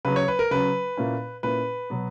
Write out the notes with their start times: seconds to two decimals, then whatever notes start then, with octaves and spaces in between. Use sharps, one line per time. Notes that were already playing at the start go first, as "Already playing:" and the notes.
0.05 C#3 F#3 C#4 B4
0.16 C#5
0.28 B4
0.39 A#4
0.51 C#3 F#3 C#4 B4
0.97 A#2 A#3 C#4 E4
1.43 A#2 A#3 C#4 E4 B4
1.90 B2 F#3 B3